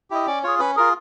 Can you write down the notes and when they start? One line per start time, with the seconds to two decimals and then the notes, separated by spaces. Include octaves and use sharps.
0.10 E4 G4 D#5
0.27 C#4 D5
0.43 F4 G#4 C#5
0.59 C#4 B4
0.76 F4 G#4 A#4